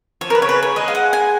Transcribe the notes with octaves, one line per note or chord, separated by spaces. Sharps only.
F3 C#5
A#4
B4
C#3 C#5
B4
C#5
G#3 D#5
F5
F#5
G#5